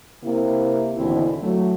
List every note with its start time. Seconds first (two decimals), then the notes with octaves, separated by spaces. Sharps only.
0.22 C3 A#3 E4
0.96 D#2 B2 D3 E3 C4 E4
1.41 F#3 A3